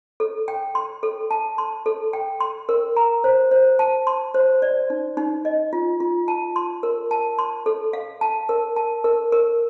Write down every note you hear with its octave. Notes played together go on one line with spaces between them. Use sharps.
A4
G5
C6
A4
A5
C6
A4
G5
C6
A#4
A#5
C5
C5
A5
C6
C5
D5
D#4
D#4
D#5
F4
F4
A5
C6
A#4
A5
C6
A4
F5
A5
A#4
A5
A#4
A#4